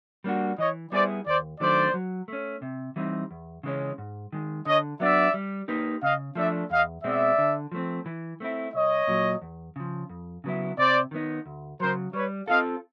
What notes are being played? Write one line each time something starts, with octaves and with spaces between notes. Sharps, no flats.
G3 A#3 D4 F#4
E3 C#5 D#5
G3 B3 E4 G#4 C5 D5
D#2 C5 D5
D#3 F#3 A3 D4 C5 D5
F#3
A3 C#4
C3
E3 G3 C4 D#4
E2
C#3 E3 G#3 C#4
G#2
D#3 G#3
D3 C#5 D#5
F#3 B3 D4 D5 E5
G3
A#3 D#4 G4 B4
C#3 D#5 F5
F3 A3 D4 D5 E5
E2 D#5 F5
B2 G#3 C4 D5 E5
D3
F3 A3 C4
E3
A3 C4 E4
C2 C#5 D#5
A#2 F#3
E2
C#3 F3
F2
C#3 F#3 B3 E4
C3 C5 D5
D#3 G3 B3 D#4
D2
C#3 F#3 A#4 C5
G3 B4 C#5
C4 F4 A4 D#5 F5